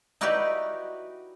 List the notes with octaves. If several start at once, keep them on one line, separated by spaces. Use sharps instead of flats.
D#4 E4 F#4 G4 B4 D5